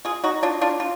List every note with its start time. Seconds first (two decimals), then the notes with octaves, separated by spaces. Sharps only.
0.05 F4 G#4
0.24 D#4 F#4
0.43 D4 F4
0.61 D4 F4
0.80 F4